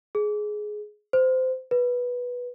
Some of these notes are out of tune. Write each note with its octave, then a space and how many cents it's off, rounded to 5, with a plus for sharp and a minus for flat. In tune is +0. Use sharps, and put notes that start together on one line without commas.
G#4 +15
C5 -20
B4 -10